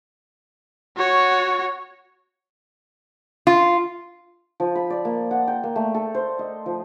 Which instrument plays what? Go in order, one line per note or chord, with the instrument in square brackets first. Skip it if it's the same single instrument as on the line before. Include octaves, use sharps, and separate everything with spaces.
[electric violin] F#4 C#5
[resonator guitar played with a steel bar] F4
[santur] F3
B5
D5
A#3
F#5
G5
A#3
A3
A4
C5
D#5
F3